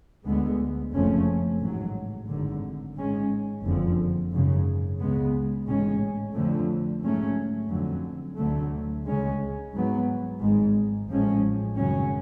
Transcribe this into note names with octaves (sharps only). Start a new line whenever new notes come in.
D2 D3 G#3 B3
F#1 F2 F3 A3 C#4
A1 G#2 F#3
G#1 F#2 D3
G#2 G#3 C#4
F#1 F2 D3 F3
G#1 F#2 C#3
C#2 C#3 G#3 B3
A1 G#2 G#3 C#4
F2 D3 F3 A3
G#2 F#3 A3 C#4
F2 D3 F#3
D2 D3 F#3 A3
C#2 C#3 G#3 C#4
G#2 F#3 B3
G#1 G#2 G#3
A1 A2 F3 G#3 C#4
G#1 F#2 C#3 F#3 C#4